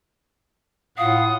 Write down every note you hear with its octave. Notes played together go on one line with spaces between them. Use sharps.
A2 F4 F5 F#5 D#6